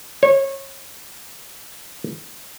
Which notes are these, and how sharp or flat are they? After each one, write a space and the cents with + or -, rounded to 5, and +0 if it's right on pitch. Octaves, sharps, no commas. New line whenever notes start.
C#5 -25